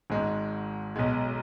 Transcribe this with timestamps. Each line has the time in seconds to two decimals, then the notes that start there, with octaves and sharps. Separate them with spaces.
0.10 G#1 G#2 G#3
0.96 B1 B2 G#3